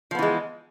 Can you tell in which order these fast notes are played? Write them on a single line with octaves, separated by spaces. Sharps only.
F3 B3 E3 G#3